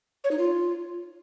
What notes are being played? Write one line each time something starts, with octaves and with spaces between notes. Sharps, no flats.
C#5
D#4
F4